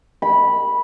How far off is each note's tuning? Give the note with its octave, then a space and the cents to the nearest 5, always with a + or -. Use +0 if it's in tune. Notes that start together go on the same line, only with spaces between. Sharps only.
B5 -10